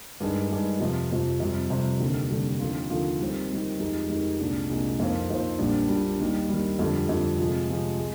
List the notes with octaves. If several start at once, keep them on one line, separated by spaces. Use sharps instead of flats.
G2 D#3 G#3 D4
G2 D#3 G#3 D4
F2 C3 F3
F2 C3 F3
F2 C3 G3
F2 C3 G3
F1 D#2 D3 G3
F1 D#2 D3 G3
D#2 D3 F3 A#3 F4
D#2 D3 F3 A#3 F4
D#3 G3 C4
D#3 G3 C4
F2 D#3 G#3 D#4 G4
F2 D#3 G#3 D#4 G4
C2 A#2 G#3 D4
C2 A#2 G#3 D4
F2 D#3 A#3 F4 C5
F2 D#3 A#3 F4 C5
A#1 A#2 G3 D4
A#1 A#2 G3 D4
D#2 D#3 G3
D#2 D#3 G3
F2 D3 G3
F2 D3 G3
C3 F3 G#3
C3 F3 G#3
G#3